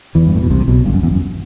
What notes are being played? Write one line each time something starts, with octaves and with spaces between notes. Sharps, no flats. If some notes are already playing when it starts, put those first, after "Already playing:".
E2 E3
G2
A2
B2
C2 C3
B1 B2
G1 G2
F#2
E2
F#2